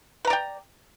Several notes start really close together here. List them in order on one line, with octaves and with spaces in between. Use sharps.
B4 A#5 D5 G5